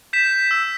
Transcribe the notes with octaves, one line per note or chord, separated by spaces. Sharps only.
G6 B6 E7
E6